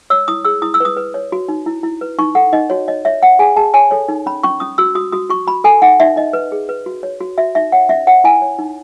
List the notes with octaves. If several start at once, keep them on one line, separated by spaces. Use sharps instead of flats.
C#5 E6
E4 D#6
G#4 E6
E4 D#6
E6
B4 D#6
B4
C#5
F#4
D#4
E4
E4
B4
D#4 C#6
A4 F#5
D#4 D#5
F#4 C#5
C#5 D#5
C#5 E5
C#5 F#5
G#4 G#5
G#4 A5
C#5 G#5
A4 C#5
D#4
C#4 B5
C#4 C#6
C#4 D#6
F#4 E6
F#4 D#6
F#4 D#6
F#4 C#6
F#4 B5
A4 G#5
D#4 F#5
D#4 E5
D#4 D#5
B4
G#4
B4
F#4
C#5
F#4
F#4 E5
D#4 E5
C#5 F#5
C#4 E5
C#5 F#5
E4 G#5
C#5
D#4